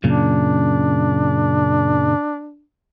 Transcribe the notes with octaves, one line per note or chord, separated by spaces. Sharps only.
F#2 A#2 C#3 D4